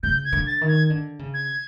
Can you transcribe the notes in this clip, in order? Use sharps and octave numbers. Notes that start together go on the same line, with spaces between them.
C#3 G6
G#6
D3
A6
D#3
G#6
D3
C#3
G#6